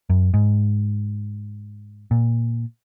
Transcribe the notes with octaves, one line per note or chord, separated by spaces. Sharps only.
F#2
G#2
A#2